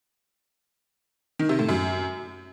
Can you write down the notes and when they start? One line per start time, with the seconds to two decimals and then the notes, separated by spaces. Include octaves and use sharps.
1.39 D#3
1.49 C3
1.59 A2
1.69 F#2